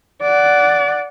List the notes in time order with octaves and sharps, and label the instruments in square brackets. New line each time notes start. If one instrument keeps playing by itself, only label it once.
[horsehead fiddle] D5 F#5